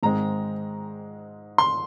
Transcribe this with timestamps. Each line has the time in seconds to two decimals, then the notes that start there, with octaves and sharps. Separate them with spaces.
0.03 G#2 D#3 G#3 C4 A#5
1.58 C6